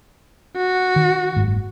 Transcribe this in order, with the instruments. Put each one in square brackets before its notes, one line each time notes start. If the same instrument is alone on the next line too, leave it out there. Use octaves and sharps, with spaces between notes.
[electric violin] F#4
[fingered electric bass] D#3
F#1 G#2